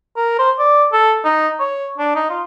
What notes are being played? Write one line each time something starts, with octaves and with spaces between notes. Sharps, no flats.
A#4
C5
D5
A4
D#4
C#5
D4
D#4
F4